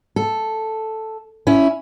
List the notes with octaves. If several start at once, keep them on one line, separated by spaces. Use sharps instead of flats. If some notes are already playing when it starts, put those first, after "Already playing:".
A4
C#4 E4